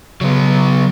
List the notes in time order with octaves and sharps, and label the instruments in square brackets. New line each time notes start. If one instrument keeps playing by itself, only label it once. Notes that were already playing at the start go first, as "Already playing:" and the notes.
[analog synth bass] C#3 [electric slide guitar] F#3 B3